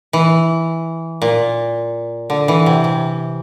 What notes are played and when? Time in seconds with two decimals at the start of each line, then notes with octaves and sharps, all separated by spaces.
0.13 E3
1.22 A#2
2.30 D3
2.48 E3
2.66 C3
2.84 C3